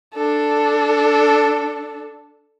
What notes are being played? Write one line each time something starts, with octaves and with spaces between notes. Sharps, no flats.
D4 A4